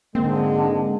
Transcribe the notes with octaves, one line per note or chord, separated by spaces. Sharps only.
G#2 D3 G#3 A#3 C4